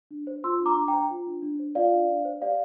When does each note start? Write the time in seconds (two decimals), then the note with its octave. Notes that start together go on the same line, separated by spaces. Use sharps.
0.11 D4
0.27 C5
0.44 F4 C6 E6
0.60 D4
0.66 A#5 D6
0.77 D4
0.88 C5 G5 A#5
1.10 F4
1.27 D4
1.43 D4
1.59 C5
1.75 F4 D5 F5
1.92 D4
2.09 D4
2.25 C5
2.42 G4 D5 F5